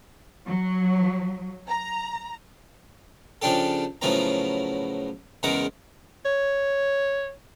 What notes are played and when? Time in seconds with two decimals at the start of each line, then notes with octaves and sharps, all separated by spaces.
0.47 F#3
1.67 A#5
3.42 C#3 F3 D4 G4 A4
4.02 A2 C#3 F3 F#3 B3 A#5
5.43 E2 C#3 G#3 A#4 F#5 D6
6.26 C#5